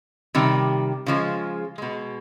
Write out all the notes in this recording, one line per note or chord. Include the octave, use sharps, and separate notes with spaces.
C3 D#3 G3
C#3 F3 G#3
B2 G#3